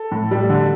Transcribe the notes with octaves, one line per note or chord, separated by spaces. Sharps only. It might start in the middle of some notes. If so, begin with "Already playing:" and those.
Already playing: A4
A2
G3
D3